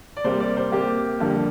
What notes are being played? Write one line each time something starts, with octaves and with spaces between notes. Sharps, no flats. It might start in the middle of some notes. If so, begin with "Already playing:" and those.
D5
C3 G3 A#3 C5
D5
C5
C3 A#3 G4
F2 D3 G3 A#3